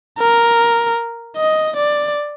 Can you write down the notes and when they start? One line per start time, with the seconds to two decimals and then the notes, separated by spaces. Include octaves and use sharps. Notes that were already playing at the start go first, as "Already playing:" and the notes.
0.19 A#4
1.37 D#5
1.77 D5